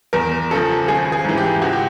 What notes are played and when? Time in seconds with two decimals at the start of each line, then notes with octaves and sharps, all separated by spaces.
0.13 E2 A#4
0.51 C#3 F3 A4
0.88 G#1 G#4
1.12 G#4
1.24 G#2 E3
1.38 G4
1.62 C#2 F#4
1.73 G4